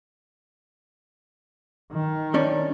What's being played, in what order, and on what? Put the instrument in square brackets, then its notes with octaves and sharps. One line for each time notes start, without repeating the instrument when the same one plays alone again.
[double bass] D#3
[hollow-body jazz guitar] G3 C#4 D4